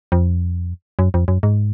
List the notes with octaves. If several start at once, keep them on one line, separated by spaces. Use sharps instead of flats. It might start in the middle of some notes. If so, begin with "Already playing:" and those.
F2
F#2
F2
F#2
G#2